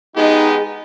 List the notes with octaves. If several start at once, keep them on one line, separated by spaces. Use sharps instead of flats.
G#3 B3 D#4 G4 G#4